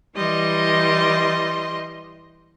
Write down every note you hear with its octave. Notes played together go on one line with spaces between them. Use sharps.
E3 G3 D#5 C6